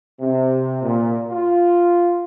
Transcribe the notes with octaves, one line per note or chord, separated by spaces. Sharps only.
C3
A#2
F4